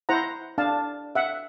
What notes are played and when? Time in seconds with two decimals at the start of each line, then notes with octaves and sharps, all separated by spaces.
0.09 E4 C5 F#5 A#5
0.58 D4 F5 A5
1.15 E5 F#5